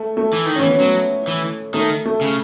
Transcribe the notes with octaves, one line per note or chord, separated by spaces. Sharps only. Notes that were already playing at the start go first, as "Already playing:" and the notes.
Already playing: A3
A3
E3
D#3
C#4
E3 B3
C#4
F#3 B3
E3
D#3 A3
A3
C#3